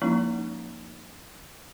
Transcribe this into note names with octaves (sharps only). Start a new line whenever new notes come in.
F3 G#3 A#3 C#4 D#4 E4